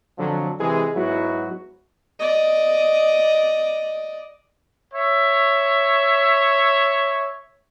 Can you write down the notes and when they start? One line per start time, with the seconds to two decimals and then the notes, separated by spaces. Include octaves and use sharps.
0.18 F2 D3 F3 F#3
0.60 C3 E3 G#3 G#4
0.95 G#2 F#3 B3 E4 F#4
2.19 D5 D#5
4.93 C#5 E5